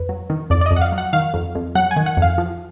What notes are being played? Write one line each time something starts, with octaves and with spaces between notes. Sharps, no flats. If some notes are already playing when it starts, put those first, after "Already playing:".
Already playing: F2 B4
F#3
D#3
F2 D5
D5
D#5
F2
F#5
F5
F#3
F#5
D#3 F5
F2
F2
F#3 F#5
G#5
D#3
F#5
F2 F5
F3